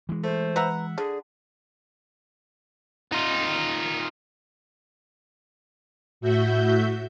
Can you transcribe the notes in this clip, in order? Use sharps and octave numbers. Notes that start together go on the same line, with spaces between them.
E3 G#3
A3 C5
B4 E5 F#5 A#5
D3 G#4
D#4 F4
A2 F#4 E5 G6